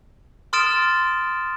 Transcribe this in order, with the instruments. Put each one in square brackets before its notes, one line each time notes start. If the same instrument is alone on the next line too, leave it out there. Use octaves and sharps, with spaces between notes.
[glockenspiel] C6 D#6 F6 A6 D7 E7